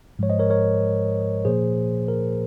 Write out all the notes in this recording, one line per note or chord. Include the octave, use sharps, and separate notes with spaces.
G#2 F3 G#3 C#5
C5 D#5
A#4 C#5
A#4 C#5
A#2 F3 A#3 G#4 C5
A#4